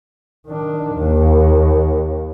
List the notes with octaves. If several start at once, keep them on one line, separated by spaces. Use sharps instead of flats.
D#3 D4
D#2